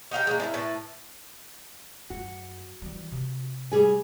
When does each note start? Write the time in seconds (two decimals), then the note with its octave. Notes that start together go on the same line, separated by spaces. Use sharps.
0.11 D#4 G4 F5 G5
0.27 G#3 A#3
0.40 D4 E4 A#4
0.54 A2 B4 A5
2.10 F#2 F#4
2.82 E3 G3
3.12 C3
3.72 G3 G#4 G#5